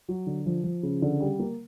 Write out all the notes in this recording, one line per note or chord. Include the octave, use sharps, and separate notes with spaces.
F#3
D3
F3
F3
C#3
D3
G3
A#3